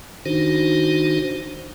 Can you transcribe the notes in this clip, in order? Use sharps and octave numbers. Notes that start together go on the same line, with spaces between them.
D#3 D4 D#4 F#4 C5